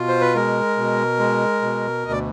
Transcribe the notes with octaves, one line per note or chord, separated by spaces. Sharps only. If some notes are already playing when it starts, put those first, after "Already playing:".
Already playing: B2 F4
C5
B4
G#3 A#4
B2
G#3
B2
D2 D#5
D5